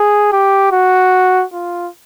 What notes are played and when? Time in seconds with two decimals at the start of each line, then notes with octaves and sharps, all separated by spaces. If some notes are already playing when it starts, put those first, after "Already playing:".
Already playing: G#4
0.33 G4
0.72 F#4
1.53 F4